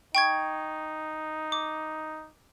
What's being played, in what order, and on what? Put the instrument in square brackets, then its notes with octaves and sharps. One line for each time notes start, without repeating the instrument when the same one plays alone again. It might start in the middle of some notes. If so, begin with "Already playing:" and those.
[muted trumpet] D#4 [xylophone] G5 C#6 G#6
[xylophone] D6